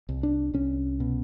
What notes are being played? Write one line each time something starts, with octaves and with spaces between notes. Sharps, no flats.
C2
D4
C2 C#4
B2